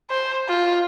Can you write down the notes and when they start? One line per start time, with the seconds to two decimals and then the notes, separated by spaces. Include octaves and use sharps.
0.10 C5
0.48 F4